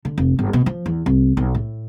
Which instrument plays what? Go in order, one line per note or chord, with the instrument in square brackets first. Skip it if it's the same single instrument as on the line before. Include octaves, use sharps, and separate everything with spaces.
[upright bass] D3
F1
G1
B2
F3
E2
C2
B1
A2